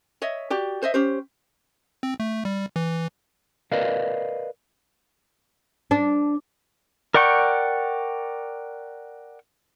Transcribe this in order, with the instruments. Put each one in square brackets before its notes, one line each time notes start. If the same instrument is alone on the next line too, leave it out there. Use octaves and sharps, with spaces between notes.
[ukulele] C#5 D#5 E5
F#4 G4 D5
C5 D#5 E5
C#4 G4 C5
[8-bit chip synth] C4
A3
G3
E3
[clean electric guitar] A#4 B4 D5 D#5 F5
[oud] D4
[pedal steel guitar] A#4 D5 F#5 G5 C#6